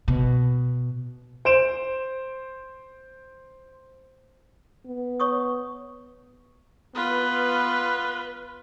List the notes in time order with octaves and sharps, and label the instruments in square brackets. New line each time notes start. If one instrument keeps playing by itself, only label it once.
[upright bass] B2
[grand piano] C5 D7 E7
[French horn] B3
[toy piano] C#5 C#6 D#6
[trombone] B3 [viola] F4 B4